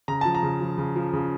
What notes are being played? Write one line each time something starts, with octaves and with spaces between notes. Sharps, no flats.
C#3 A#5
F3 A5
A#5
C#3
F3
C#3
F3
C#3